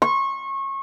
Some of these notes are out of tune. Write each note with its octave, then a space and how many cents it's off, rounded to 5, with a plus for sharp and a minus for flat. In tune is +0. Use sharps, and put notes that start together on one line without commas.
C#6 -30